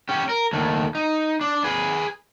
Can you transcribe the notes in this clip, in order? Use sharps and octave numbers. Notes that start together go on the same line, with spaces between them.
C#4 G4
A#4
D#2 A3
D#4
D4
G#4 B4